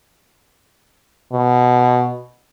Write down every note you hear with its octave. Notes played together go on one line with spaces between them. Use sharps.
B2